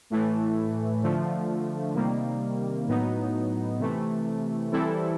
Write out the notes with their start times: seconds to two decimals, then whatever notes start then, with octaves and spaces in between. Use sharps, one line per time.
0.10 A2 E3 A3
1.03 D3 F3 A3
1.95 C3 D#3 G3 A#3
2.88 A2 F#3 B3 D#4
3.79 C3 E3 A3
4.72 E3 G3 C4 E4 A4